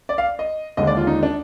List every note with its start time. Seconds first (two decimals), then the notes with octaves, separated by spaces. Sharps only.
0.09 D5
0.18 F5
0.39 D#5
0.77 D#2 D3 G#3 D#5
0.87 D5
0.97 F4
1.07 D#4
1.23 D4